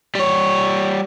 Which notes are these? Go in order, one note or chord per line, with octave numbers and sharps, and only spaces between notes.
G3 C#5